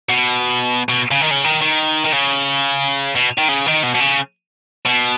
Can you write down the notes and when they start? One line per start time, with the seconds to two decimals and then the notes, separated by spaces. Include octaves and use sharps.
0.09 B2
0.89 B2
1.11 C#3
1.21 D#3
1.31 C#3
1.44 D#3
1.62 D#3
2.05 D#3
2.13 C#3
3.16 B2
3.38 D#3
3.49 C#3
3.66 D#3
3.83 B2
3.94 B2
4.00 C#3
4.85 B2